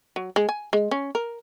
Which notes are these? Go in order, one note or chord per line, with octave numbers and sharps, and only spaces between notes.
F#3
G#3
G#5
G#3
C#4
A#4